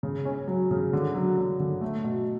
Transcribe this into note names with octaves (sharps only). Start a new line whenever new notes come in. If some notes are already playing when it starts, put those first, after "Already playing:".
C#3
C#4
F#3
C#3
D3
F#3
D3
D3
A3
B2